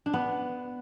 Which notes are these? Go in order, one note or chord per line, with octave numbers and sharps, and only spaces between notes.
D4
B3